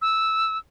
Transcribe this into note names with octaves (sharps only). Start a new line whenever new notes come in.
E6